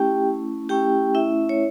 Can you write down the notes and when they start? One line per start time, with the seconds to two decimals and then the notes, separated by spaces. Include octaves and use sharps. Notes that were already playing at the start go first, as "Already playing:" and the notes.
Already playing: A3 C#4 E4 G4 G5
0.69 A3 C#4 E4 G4 G5
1.15 E4 E5
1.49 C#5